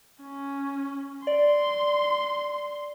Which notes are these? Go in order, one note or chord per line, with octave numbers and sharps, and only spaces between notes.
C#4
D5 C6